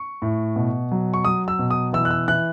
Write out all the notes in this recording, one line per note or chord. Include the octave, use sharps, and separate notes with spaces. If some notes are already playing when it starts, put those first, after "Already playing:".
Already playing: C#6
A2
B2
F#3
C#6
F#3 D#6
E6
B2
D#6
E3 E6
F#6
E6
E3 F#6